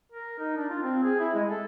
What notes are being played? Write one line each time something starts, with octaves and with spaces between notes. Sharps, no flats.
A#4
D#4
D4
F4
C4
G#4
E4
G#3
A4